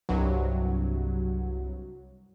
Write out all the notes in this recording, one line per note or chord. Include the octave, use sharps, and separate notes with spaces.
C2 G2 F#3